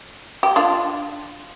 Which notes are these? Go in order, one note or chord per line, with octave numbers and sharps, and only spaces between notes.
G4
D4 F4